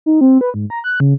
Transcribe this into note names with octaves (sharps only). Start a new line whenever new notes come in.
D#4
C4
B4
G#2
A#5
F#6
C#3